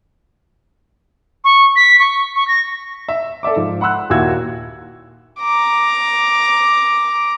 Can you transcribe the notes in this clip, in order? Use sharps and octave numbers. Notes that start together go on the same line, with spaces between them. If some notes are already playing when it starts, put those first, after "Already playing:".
C#6
B6
C#6
C#6
A#6
E5
A4 D5 E5 D6
G#2 F3
F#5 B5 C6 E6 F#6
D#2 A#2 E4 F#4 E6 G#6
A#5 D6